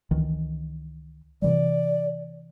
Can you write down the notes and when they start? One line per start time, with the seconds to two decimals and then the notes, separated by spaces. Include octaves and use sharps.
0.11 C#2 D#3 E3
1.42 C3 E3 G3 D5